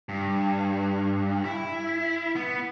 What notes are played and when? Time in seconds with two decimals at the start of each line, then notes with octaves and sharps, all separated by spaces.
0.09 G2
1.45 E4
2.36 B3